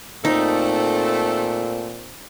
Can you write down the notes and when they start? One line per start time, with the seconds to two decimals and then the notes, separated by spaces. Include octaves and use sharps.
0.25 A#2 A3 C4 D#4 A4